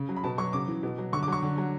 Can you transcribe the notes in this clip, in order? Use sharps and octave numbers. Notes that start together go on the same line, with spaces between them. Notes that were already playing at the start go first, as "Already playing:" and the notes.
Already playing: C#3
F#3
B5
B2 A5
F#3 C#6
C#3 D6
E3
B2
F#3
D3 C#6
D6
F#3 C#6
D3
F#3